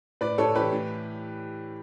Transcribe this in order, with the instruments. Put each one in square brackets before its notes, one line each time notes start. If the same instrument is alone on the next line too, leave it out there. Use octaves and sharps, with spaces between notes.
[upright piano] A2 B4 D5
A2 A4 C#5
E3 G4 B4
A2